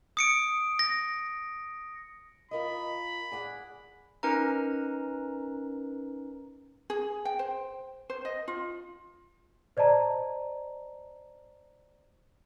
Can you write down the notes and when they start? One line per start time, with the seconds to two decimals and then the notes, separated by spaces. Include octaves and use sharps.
0.17 D#6 C#7 D7
0.79 A#6
2.51 F4 A#4 D#5 B5
3.32 G#4 D5 F#5
4.23 C#4 D#4 A#4 B4 A#5
6.90 G#4
7.25 G5
7.39 C5
8.10 C5
8.25 D#5
8.48 F4
9.77 C5 D5 D#5 A5 A#5